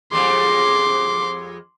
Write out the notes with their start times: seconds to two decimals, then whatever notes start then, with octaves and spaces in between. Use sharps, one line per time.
0.12 F2 G3 G#3 C6 D6